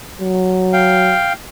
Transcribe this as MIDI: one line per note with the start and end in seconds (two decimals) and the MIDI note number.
0.21 1.16 54
0.73 1.33 77
0.73 1.33 79